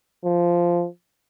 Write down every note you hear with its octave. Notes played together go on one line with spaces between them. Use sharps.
F3